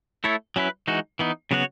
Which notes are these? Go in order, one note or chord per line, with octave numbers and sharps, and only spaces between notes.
A3 E4 A4 C#5
F#3 C#4 E4 B4
E3 G#3 D#4 F#4
E3 B3 D#4
C#3 F#3 B3 F#4 C#5